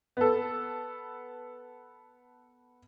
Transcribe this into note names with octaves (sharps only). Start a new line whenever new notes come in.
B3 A4